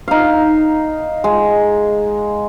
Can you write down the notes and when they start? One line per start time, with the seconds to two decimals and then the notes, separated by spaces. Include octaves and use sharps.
0.08 D#4 F5
1.24 G#3